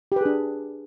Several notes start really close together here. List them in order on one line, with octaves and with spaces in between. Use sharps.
G4 B4 G#4 D4